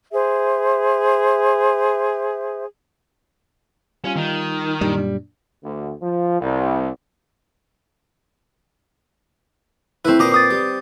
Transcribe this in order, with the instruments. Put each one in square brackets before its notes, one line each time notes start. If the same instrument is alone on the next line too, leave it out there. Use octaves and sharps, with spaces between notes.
[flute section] G#4 C5 E5
[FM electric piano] G3 F4 [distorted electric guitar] C#4
[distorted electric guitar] D#3
[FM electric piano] F#2 A#2 D4 [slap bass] G3
[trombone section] D2
F3
C2
[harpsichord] A3 E4 [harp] C4 B4
[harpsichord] A#2 A5 A#5 [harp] D6 D#6 C7
[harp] D6 D#6 A6
[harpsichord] G3